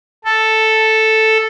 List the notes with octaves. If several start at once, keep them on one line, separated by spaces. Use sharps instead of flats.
A4